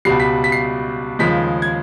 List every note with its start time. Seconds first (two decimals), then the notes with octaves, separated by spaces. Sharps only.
0.05 C#2 B2 G3 C7
0.20 B6
0.44 B6
0.52 C7
1.19 D#2 C#3 F3 G#3 B6
1.62 G#6